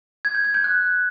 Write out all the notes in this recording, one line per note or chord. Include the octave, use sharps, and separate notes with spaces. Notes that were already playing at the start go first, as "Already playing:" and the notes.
G#6
G6
G#6
G6
F#6